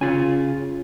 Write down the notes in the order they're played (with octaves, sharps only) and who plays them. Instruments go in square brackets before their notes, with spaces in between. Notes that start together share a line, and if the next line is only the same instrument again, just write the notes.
[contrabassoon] C#3 [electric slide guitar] F4 G#5